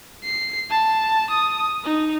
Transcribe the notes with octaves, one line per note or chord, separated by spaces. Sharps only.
C7
A5
D#6
D#4